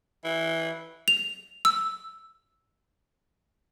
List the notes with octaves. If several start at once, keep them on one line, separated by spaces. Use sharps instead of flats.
E3
F7
E6